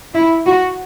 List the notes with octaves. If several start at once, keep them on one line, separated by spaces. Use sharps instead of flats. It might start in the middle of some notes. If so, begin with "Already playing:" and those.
E4
F#4